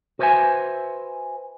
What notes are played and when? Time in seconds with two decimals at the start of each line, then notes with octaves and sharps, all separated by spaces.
0.19 F#4 B4 C5 D5 E5 G#5